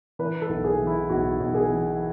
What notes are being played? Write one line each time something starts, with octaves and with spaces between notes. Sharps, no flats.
E3 B4
A4
B1
G#4
E3
E4
B1 F#4
B1
G#4
E3